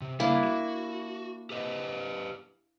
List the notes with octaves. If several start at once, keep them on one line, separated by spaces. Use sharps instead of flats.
C3
C#3 G3 A#3 D4 E4
F#4
G4 B4 D#5